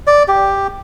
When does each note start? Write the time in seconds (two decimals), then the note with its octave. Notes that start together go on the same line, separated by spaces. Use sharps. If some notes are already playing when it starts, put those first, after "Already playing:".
0.07 D5
0.28 G4